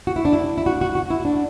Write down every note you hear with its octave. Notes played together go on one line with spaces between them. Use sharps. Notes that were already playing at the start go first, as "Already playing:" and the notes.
F#4
E4
D4
E4
E4
F#4
F#4
F#4
E4
D4